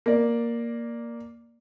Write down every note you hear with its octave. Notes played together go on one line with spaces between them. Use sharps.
A#3 D5